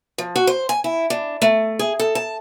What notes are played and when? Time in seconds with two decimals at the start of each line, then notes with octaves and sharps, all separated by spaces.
0.18 F3
0.36 F#4
0.47 C5
0.69 G#5
0.84 E4
1.10 D4
1.42 A3
1.79 G#4
2.00 A4
2.15 A5